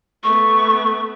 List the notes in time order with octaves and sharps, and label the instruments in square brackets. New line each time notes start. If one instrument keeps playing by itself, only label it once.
[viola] A3 B3 [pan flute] C#6